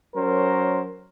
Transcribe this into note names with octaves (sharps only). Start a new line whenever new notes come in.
F#3 C#4 A#4 C5